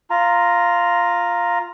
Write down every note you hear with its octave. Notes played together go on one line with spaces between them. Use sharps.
F4 A#5